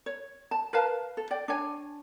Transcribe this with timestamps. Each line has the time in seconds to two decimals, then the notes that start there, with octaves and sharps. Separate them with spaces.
0.06 C#5
0.51 A5
0.73 A#4 B4 F5 A5
1.17 A4
1.31 D5 G5
1.48 D4 C#5 G#5